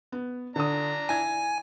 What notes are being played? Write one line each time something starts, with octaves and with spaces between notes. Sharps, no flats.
B3
D3 D4 A#5 D#6
E4 G#5 G#6